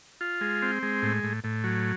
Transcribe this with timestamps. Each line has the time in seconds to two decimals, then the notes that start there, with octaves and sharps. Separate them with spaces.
0.21 F4
0.41 G#3
0.62 C4
0.83 G#3
1.02 A2
1.24 A2
1.44 A2
1.64 F#3